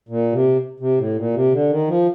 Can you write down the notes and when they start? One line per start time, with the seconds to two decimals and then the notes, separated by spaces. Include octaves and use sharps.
0.08 A#2
0.32 C3
0.80 C3
0.98 A2
1.16 A#2
1.34 C3
1.52 D3
1.70 D#3
1.88 F3